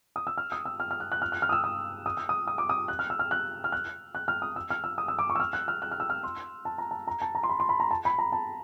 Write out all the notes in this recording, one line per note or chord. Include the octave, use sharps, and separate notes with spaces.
D#6
E6
F6
D#6
E6
F6
F6
F#6
F#6
F6
F#6
F6
D#6
E6
D#6
D#6
E6
D#6
D#6
D6
D#6
F#6
F6
E6
F6
F#6
F6
F#6
F#6
F6
D#6
E6
F6
E6
D#6
E6
D6
C#6
E6
F6
F#6
F6
F#6
F6
E6
F6
C6
A5
A#5
A5
A#5
A5
A#5
C6
B5
C6
B5
A#5
A5
B5
A#5
A5